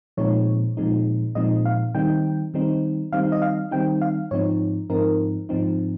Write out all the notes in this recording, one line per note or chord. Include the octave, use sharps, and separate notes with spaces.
A#2 F3 G#3 C4 D#4 C#5
A#2 F3 G#3 C4 D#4
A#2 F3 G#3 C4 D#4 D#5
F5
D#3 G3 C4 D#4 G5
D#3 G3 C4 D#4
D#3 G3 C4 D#4 F5
D#5
F5
D#3 G3 C4 D#4 G5
F5
G#2 F3 C4 D#4 C#5
G#2 F3 C4 D#4 A#4
G#2 F3 C4 D#4